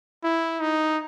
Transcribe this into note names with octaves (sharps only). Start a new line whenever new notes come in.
E4
D#4